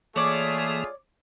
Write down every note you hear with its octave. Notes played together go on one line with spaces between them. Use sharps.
E3 A3 A#3 F4 G#4 C#5 D5